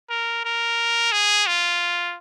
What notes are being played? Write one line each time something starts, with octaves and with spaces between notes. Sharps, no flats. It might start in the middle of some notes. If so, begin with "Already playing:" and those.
A#4
A#4
G#4
F4